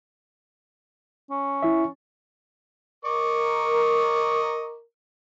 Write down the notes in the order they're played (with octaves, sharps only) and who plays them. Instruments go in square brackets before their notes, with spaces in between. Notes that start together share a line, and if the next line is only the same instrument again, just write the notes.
[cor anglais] C#4
[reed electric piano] E4 E5
[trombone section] A#4 [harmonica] D#5 C#6 D6